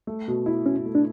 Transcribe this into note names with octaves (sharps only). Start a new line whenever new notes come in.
A3
B2
E4
B2 C#4
A3
D4